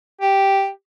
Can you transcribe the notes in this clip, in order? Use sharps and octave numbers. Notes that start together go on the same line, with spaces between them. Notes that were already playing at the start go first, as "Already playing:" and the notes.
G4